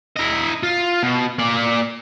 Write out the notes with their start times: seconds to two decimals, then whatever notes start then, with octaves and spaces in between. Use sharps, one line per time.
0.16 E4 D#5
0.63 F4
1.03 B2
1.39 A#3 D5